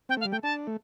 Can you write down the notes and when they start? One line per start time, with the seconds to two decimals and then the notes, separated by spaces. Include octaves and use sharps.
0.09 C4 G5
0.17 A3
0.21 F5
0.25 G3
0.32 A3 G5
0.43 D4 A5
0.67 A3